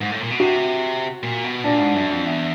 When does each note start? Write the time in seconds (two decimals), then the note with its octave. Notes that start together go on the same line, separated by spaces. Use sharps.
0.01 G#2
0.11 A2
0.21 A#2
0.30 B2
0.40 C3 F#4
1.23 A#2
1.44 B2
1.64 A#2 D4
1.79 G#2
1.96 F#2
2.11 F2
2.26 E2